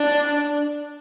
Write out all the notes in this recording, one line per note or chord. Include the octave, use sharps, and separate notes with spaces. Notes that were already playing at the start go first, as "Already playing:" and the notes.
Already playing: D4